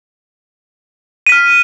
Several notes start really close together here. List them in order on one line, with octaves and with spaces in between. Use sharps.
D#7 B6 F6